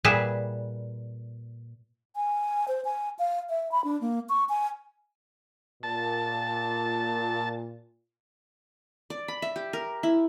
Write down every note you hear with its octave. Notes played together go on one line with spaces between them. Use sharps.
A#2 G3 G#4 B4 E5
G#5
C5
G#5
F5
E5
B5
D4
A#3
C#6
G#5
A#2 A5
D5
B5
E5
G4
A#4
E4